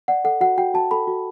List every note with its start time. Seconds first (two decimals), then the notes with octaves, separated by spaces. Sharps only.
0.08 D5 F#5
0.25 A4 F#5
0.41 F#4 F#5
0.58 F#4 G5
0.74 F#4 A5
0.91 A4 B5
1.08 F#4